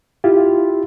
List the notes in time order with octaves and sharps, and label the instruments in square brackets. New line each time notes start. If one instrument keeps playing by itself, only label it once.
[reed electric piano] E4 F4 G4